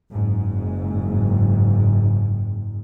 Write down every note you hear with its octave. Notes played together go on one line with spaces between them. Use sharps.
F#1 G#2